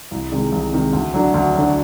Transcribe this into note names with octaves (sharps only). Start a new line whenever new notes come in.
C2
C3 D#3 G#3
C2
C3 D#3 G#3
D2
D3 F#3
D2
D3 F#3